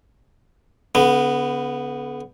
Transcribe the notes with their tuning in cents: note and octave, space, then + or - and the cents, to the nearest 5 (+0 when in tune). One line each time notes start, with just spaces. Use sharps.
D3 -45 B3 +0